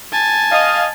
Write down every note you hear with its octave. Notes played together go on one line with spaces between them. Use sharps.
G#5 A5
D#5 F5